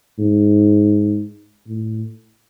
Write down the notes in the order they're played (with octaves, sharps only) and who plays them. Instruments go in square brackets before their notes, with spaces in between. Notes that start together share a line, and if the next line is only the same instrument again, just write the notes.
[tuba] G#2
A2